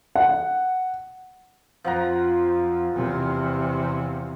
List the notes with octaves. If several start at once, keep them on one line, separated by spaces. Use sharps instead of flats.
F#5
F2 F3 F#5 A#5
E2 C3